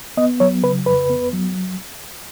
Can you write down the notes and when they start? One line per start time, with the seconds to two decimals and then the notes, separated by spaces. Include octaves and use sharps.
0.17 B3 D#5
0.40 F#3 C#5
0.64 C#3 B4
0.86 F2 B4
1.10 B3
1.33 F#3